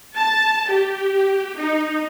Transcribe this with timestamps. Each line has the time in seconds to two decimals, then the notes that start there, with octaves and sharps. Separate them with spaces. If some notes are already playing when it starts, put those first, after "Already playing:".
0.15 A5
0.69 G4
1.56 D#4